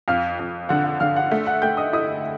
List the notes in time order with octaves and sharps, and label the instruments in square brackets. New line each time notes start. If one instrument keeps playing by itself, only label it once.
[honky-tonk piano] F2 [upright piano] F5 F6
[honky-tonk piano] F2
[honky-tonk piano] D3 [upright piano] F#5 F#6
[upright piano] F#5 F#6
[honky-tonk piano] D3 [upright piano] F5 F6
[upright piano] F#5 F#6
[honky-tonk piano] A3
[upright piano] F#5 F#6
[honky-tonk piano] A3 [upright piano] G5 G6
[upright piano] D#5 D#6
[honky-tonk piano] E4 [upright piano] D#5 D#6